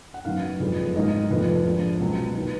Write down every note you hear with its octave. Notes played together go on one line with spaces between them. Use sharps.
F#5
F#2 D#3 F#3 B3 F5
F#1 F2 F3 G#3 B3
G#1 G#2 D#3 A#3 D#5
F1 F2 F3 A#3 B4
A#1 G#2 F3
C#2 B2 F#3 A#3
D#3 A#3 B4